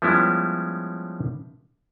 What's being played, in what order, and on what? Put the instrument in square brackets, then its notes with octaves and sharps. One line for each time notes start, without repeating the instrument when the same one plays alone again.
[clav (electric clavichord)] F3 G3 G#3 B3 C#4 E4